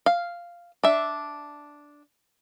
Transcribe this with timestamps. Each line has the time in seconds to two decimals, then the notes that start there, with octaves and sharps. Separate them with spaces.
0.06 F5
0.84 D4 E5